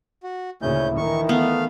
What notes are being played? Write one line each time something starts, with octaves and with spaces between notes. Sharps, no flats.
F#4
D2 A#2 C#3 C#4 E4 G6
D#3 E3 C#6
A3 B3 F5